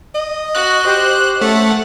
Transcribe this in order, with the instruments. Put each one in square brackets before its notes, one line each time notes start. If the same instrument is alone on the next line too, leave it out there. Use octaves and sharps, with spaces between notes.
[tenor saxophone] D#5
[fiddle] F#4 [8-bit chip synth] F#6
[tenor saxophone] G4 [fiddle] C5
[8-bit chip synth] A3 [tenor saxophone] C#4 [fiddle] F#5